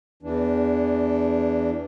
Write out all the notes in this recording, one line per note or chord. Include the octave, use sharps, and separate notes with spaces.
E2 E3 D4